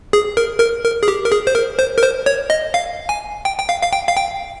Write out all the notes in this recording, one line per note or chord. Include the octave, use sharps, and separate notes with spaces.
G#4
A#4
A#4
A#4
G#4
G4
A#4
G#4
C5
A#4
C5
A#4
C5
C#5
D#5
F5
G#5
G5
G5
F5
F5
G5
F5
G5